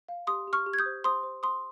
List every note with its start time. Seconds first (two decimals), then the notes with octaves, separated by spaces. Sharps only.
0.09 F5
0.27 G4 C6 D#6
0.47 G4
0.53 C#6 F6
0.66 G4
0.73 G#6
0.79 D#6 G6
0.86 C5
1.04 C5 C6 D#6
1.23 C5
1.43 C5 C6 D#6